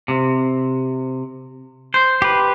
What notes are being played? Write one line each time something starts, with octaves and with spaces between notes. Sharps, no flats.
C3
C5
G4 B4